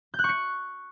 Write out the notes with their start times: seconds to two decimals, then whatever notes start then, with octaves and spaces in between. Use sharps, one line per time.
0.14 G6
0.19 F#6
0.24 C#6
0.29 C#7